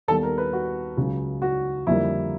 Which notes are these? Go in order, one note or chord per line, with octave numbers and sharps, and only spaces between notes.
D#2 D#3 G3 B3 A4
A#4
B4
F#4
C#2 C#3 F#3
F#4
F2 D3 G3 A#3 E4